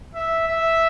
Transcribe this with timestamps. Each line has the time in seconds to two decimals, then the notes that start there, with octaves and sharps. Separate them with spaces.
0.15 E5
0.48 E5